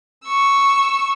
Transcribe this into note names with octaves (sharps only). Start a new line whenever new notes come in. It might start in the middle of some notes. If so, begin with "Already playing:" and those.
C#6 E6